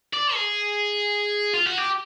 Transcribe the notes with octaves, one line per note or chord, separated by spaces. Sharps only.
D5
G#4
F4
F#4
G4